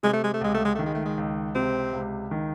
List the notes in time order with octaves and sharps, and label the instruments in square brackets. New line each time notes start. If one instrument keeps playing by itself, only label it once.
[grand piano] C3 [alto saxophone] G#3
[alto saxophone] A3
G#3
A3
[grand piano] C#2 [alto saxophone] G#3
[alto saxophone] A3
G#3
[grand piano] D#3 [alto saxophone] A3
[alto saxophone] G#3
A3
G#3
[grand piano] C#2
[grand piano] C3 [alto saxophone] C4
[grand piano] C#2
D#3